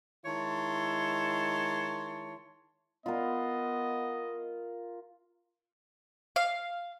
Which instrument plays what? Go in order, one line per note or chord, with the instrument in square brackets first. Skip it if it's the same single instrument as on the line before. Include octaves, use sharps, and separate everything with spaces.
[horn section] D#3 G#3 E4 C#5 A5 C6
[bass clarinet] B3 [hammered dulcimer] F4 A#4 [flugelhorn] D#5
[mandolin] F5